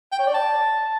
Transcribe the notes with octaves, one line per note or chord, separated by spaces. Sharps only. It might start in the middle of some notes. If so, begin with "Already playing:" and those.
G5
C#5
D5
A5